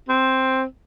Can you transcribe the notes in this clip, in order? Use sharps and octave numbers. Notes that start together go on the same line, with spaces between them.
C4